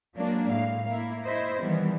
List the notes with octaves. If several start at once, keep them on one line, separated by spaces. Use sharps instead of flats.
F#3 G#3 A#3 D4
A2 F5
A#3 E4
E4 C5 D#5
D#3 E3 G3 B3